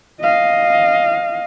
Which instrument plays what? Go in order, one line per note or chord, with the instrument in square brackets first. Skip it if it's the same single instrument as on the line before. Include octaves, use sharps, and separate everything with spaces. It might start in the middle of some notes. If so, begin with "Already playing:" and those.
[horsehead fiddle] D#5 F5